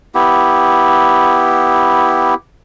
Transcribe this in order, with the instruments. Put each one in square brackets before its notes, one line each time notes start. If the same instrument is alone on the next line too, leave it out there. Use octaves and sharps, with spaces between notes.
[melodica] B3 E4 G4